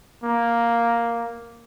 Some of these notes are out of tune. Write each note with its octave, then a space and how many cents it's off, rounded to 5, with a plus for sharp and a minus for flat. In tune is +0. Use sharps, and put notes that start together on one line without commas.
A#3 +5